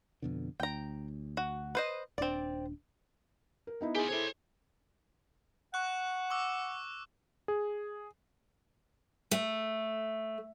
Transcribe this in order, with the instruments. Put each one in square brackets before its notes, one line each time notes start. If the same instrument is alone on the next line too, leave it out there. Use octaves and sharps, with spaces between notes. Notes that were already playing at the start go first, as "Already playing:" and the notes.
[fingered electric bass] F2 B2 D3
[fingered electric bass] D2 [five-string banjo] G5 A#5
[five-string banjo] F#4
B4 C5 D#5
[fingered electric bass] D#1 D4 [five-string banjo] C4 D5
[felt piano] A#4
B3 D#4 E4
[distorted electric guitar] F4 G4 [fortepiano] G#4
[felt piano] E4 A4 C5 [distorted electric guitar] C#5 C6
[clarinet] F#5 [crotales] C#6 F#6
[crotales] C#6 D6 E6
[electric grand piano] G#4
[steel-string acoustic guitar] A3